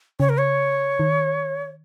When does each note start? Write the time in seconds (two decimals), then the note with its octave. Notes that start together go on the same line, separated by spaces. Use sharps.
0.20 C#3 C#5
0.29 A#4
0.39 C#5
1.00 D#3